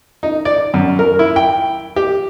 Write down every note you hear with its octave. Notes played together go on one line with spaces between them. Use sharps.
D#4
D5
F#2
A#4
E4
G5
G4